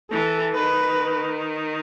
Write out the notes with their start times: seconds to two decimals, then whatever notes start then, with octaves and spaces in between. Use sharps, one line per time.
0.11 E3 A4
0.55 D#3 B4